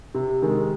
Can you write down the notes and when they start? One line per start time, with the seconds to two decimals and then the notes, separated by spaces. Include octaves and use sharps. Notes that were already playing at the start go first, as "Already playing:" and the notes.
0.14 C3
0.42 D#3 G#3